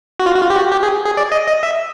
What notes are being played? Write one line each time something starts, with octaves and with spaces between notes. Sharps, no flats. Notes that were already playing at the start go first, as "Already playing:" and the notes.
F#4
F4
F#4
F4
G4
F#4
G4
G#4
G#4
D5
D#5
D#5
E5